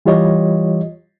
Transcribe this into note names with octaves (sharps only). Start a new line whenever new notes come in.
E3 G3 F4 G4 C#5 D#5